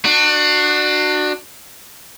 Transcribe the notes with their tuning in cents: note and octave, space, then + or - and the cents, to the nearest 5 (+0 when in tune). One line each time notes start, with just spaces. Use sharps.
D4 +30 F#4 +0